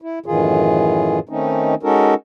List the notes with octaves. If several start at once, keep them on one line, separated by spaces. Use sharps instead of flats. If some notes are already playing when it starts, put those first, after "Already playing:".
E4
F#2 A2 D#3 E3 F4 G#4
D#3 A3 C4 C#4 D#4
G#3 C#4 D#4 F#4 A4 A#4